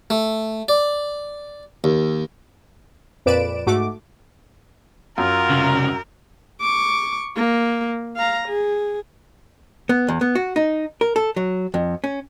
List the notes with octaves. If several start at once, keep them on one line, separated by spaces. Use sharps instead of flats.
A3
D5
D#2
F2 A#2 B4 D5 D7 E7
G#2 A3 F#4 D6
F#2 F4 A#4
C2 C#3
C#6 D6
A#3
F5 A#5
G#4
B3
E2
B3
F#4
D#4
A#4
A4
F#3
F2
C#4